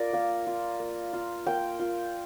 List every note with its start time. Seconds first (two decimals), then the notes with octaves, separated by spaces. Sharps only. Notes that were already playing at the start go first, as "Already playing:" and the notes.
Already playing: F4 A#4 D5
0.13 A#3 F5
0.47 F4
0.80 A#3
1.13 F4
1.46 A#3 G5
1.79 F4